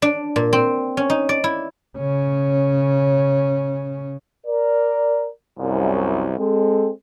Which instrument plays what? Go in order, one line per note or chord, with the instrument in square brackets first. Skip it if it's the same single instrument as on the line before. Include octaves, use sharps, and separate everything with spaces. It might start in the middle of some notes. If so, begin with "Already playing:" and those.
[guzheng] D4
A#2
C4
C#4
D#4
D5
E4
[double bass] C#3 C#4
[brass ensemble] A#4 D5
C2 F#2
G#3 C4 A4